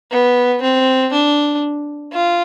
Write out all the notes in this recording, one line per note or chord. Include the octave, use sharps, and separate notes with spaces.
B3
C4
D4
F4